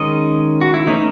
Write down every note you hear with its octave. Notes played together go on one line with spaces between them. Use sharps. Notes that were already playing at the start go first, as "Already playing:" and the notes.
Already playing: D#3 G#3 C#4 D#5
F#4
E4
E3 A3 C#4 D#4